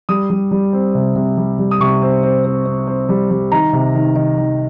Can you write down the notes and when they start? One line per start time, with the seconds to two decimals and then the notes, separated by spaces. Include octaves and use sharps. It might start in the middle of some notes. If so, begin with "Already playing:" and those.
0.09 G3 D#6
0.30 G3
0.51 G3
0.73 C4
0.95 C3
1.16 C3
1.37 G3
1.59 G3
1.71 D#6
1.80 C3 C#6
2.02 C4
2.23 C4
2.45 C4
2.66 C4
2.87 C4
3.09 G3
3.31 G3
3.52 D#3 A#5
3.73 C3
3.95 D#3
4.16 D#3
4.38 D#3